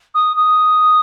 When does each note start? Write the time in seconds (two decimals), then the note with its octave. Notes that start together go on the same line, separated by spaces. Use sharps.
0.14 D#6
0.37 D#6